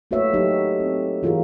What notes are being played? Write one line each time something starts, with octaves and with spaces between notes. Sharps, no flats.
A3 A#3 F#4 B4 C#5 E5
F#3 A#3 D#4 G4 A4 D#5
C4
E3 F4 F#4 G#4 A#4